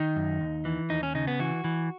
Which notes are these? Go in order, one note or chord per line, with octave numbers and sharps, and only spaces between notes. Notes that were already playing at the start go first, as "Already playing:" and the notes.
Already playing: D#3 D#4
F#2
D#2
E3
D#2 D#4
C#4
C#3 D#4
B3
E3 F#4
E3